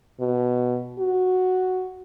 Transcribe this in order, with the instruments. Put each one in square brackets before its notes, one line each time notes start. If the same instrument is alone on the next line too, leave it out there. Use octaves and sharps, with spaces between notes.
[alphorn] B2
F#4